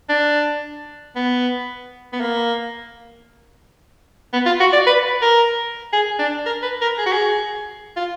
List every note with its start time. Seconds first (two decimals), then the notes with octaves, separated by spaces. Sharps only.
0.09 D4
1.16 B3
2.13 B3
2.20 A#3
4.33 B3
4.46 F4
4.60 F#4
4.73 D5
4.87 B4
5.22 A#4
5.93 G#4
6.19 D4
6.46 A#4
6.62 B4
6.81 A#4
6.98 G#4
7.06 F#4
7.13 G#4
7.96 F4